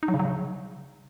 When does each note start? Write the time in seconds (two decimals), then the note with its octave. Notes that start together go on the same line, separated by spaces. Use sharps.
0.03 D#4
0.08 F#3
0.14 C#3
0.20 F#3
0.25 C#3